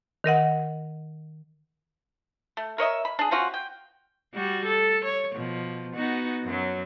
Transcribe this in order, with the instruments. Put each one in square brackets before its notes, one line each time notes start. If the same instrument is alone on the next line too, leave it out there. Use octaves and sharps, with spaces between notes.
[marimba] D#3 A#4 D#5 F#5
[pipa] A3
A#4 C#5 D#5 E5
B5
D4 G#4
C4 C#4 F4 F#4
G5
[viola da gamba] G3 F#4
A4
C#5
B2 F3
B3 D#4 F#4
F#2 F#3